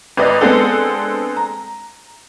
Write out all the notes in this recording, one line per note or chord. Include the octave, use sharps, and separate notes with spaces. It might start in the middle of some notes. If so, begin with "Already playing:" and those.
G#1 B4 D5 D#5
G#3 B3 C4 D4 G#4 A4
A#5